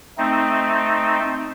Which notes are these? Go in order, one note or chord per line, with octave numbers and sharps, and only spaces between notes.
A3 C4 D#4